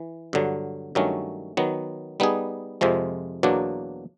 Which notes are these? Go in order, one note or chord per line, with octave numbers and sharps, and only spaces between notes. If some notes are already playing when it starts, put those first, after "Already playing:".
Already playing: E3
G2 D3 F#3
G2 D#3 F#3 A3 C#4
D#3 F#3 B3
G3 B3 D#4 G#4
F2 C3 F3 G#3
E2 B2 F#3 A#3 D4